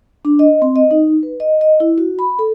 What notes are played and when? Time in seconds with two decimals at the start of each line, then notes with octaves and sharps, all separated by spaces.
0.25 D4
0.39 D#5
0.62 C4
0.76 D#5
0.91 D#4
1.23 B4
1.40 D#5
1.61 D#5
1.80 E4
1.98 F#4
2.19 B5
2.39 A4